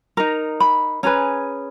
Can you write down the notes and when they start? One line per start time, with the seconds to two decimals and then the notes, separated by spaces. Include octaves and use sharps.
0.17 D#4 A#4 A#5
0.60 B5
1.03 C#4 G#4 B4 A#5